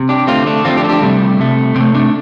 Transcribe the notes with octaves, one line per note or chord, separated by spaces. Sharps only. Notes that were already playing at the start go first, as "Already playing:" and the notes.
Already playing: C3
D4 G4
D3 A3 C4 F4
A3 D4
D3 F3 A3 C4 F4
D4 G4
A4
D4 G4
C3 G3 A3
C3 A3
C3 A3 C4
A3 D4